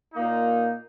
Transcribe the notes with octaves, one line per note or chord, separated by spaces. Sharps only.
A#2 A#3 D#4